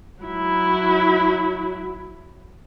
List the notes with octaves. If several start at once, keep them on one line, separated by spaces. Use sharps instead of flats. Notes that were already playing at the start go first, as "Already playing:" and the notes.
F#3 E4